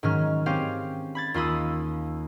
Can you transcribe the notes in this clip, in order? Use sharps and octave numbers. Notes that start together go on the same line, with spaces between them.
G#2 D#3 F#3 C#4 F6
C4 C#4 G4 F5
B5 G#6 A6
D#2 F4 B5 D#6 E6